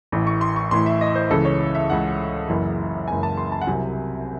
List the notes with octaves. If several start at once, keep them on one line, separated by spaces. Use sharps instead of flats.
A1 A2 E3
C#6
C6
C#6
A1 A2 E3 C6
E5
D#5
C5
C#2 C#3 E3 A4
C#5
E5
C#2 C#3 E3 F#5
F#1 F#2 E3
F#1 F#2 E3 G#5
A5
C6
A5
F#5
C2 C3 F#3 G#5